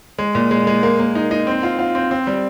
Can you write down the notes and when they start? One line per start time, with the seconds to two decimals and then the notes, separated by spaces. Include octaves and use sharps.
0.19 G#3
0.35 A#2
0.51 G#3
0.67 G#3
0.83 A#3
0.99 A#3
1.15 D#4
1.31 D#4
1.47 C4
1.63 F4
1.79 F4
1.95 C4
2.11 C4
2.27 G3